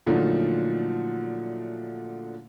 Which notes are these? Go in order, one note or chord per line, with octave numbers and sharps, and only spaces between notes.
A#2 D3 F3 F#3 A3 D#4